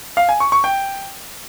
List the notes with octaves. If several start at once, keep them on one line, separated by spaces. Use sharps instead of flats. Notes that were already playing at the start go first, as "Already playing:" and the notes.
F5
G#5
C#6
C#6
G5